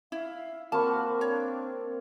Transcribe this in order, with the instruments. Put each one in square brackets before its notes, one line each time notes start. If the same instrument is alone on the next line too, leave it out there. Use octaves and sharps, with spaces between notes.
[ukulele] E4 [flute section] E5 F5
[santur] A#3 C#6 [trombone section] C4 [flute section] F#4 B5 F6 [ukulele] A5
[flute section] D4 [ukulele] C#5